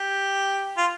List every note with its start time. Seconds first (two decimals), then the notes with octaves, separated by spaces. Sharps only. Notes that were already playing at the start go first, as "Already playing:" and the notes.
Already playing: G4
0.77 F4